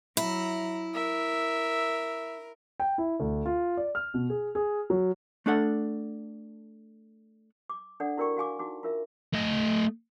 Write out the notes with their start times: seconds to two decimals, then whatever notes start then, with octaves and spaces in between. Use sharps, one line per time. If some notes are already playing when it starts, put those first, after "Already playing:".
0.17 F#3 E4 A#5
0.94 A#4 E5
2.80 G5
2.98 E4
3.20 D2
3.46 F4
3.77 D5
3.95 F6
4.14 B2
4.30 G#4
4.55 G#4
4.90 F#3
5.46 A3 D4 A4 F#5
7.70 D6
8.00 D4 A4 D5 F#5
8.17 E4 F#4 A#4 D5 G5 C#6
8.36 F#4 F5 G#5 D6
8.59 D#4 F#4 D6
8.83 F4 A#4 E5
9.33 A3 D#5